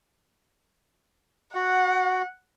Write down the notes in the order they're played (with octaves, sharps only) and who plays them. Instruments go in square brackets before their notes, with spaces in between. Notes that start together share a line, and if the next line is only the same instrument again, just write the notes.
[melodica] F#4 [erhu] F#5